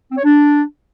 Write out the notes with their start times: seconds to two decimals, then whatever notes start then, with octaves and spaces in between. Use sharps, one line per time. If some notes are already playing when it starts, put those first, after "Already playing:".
0.12 C4
0.18 C#5
0.24 D4